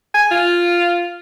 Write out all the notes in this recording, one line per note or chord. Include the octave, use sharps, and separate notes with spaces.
G#5
F4